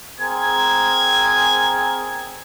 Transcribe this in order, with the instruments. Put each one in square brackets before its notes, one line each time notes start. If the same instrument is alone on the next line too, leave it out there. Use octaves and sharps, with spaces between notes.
[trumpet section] C4 G#4 A#4 [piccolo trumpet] G#6